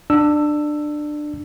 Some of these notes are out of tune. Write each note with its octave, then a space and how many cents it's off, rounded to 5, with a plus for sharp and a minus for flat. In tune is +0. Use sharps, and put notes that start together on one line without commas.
D4 +20 E6 +10